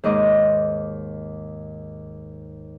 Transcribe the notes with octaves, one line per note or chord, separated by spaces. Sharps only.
D#2 G#2 D#5 D6